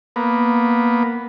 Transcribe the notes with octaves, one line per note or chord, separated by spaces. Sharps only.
A#3 B3